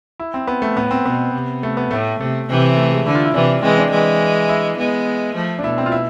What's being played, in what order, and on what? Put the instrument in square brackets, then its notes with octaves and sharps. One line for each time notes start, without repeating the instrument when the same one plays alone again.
[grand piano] E4
C4
B3
A3
[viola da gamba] A2 [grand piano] B3
[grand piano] C4
[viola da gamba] B2 [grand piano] B3
[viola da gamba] C3
[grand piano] A3
B3
[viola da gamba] A2 [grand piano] A3
[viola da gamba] C3 [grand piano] A3
[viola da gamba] C3 E3
[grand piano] A3
G#3
[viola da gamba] D3 [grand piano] E4
[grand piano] F4
E4
[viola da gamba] C3 E3 [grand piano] D4
[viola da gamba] E3 G#3 [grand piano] C4
[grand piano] D4
[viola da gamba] E3 G#3
[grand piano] E4
[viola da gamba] G#3 B3
F3 A3
[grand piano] D4
[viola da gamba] B2 [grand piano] E4
[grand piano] C4
F4
E4